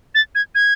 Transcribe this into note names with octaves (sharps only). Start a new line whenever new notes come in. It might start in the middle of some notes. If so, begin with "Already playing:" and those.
A6
G#6
G#6